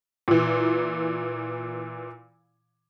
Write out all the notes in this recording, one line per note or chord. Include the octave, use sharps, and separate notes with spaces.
A#2 E3